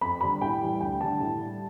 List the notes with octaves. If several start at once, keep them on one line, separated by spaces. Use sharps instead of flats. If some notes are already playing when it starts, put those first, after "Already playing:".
F2 B5
D3 G3 B5
A2 G5
E3 G3
D2 G5
D3 G3 A5
A2
G3